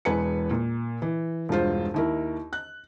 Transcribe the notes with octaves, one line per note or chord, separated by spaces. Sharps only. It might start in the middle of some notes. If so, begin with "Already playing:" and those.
E1 E2 B4 G#5 C#7
A#2
E3
E1 G2 F4 C5
D#2 E4 A#4
F#6